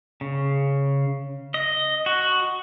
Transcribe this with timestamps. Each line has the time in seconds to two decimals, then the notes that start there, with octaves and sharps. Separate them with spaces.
0.21 C#3
1.54 D#5
2.06 F#4